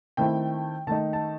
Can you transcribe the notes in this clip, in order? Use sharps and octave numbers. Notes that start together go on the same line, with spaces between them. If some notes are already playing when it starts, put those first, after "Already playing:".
D#3 A3 C4 E4 G5
D#3 A3 D#4 A5
A5